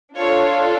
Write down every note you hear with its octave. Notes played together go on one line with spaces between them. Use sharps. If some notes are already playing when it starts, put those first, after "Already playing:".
D4 F4 A4 C#5